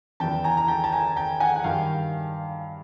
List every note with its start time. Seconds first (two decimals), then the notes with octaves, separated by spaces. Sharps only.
0.20 E2 C#3 E3 G5 A5
0.44 G#5 A#5
0.57 A#5
0.68 G5 A5
0.84 A5
0.92 G#5 A#5
1.16 G5 A5
1.40 F#5 G#5
1.56 F#5
1.64 G2 D#3 F5 G5